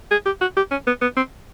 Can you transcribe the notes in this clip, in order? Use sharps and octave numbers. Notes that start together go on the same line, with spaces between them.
G#4
G4
F#4
G4
C#4
B3
B3
C4